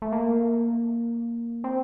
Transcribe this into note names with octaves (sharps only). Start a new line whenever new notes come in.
A3
A#3
C4